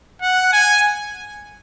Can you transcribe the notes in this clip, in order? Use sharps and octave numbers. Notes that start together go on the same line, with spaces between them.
F#5
G#5